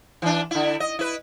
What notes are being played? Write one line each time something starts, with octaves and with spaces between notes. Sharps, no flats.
E3 D4
D3 E4
D#5
E4 B4